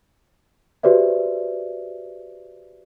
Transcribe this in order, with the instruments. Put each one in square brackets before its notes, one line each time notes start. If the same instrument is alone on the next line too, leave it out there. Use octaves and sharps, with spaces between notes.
[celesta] F#4 G4 B4 C5 D5 E5